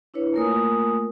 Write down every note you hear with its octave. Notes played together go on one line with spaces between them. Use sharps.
D4 E4 B4 C#5
A3 A#3 F4 A#4 G#5 D#6